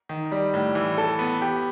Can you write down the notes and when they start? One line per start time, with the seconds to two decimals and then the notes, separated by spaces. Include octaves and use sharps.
0.09 D#3
0.32 G3
0.54 A2
0.75 E3
0.98 A4
1.19 B3
1.42 G4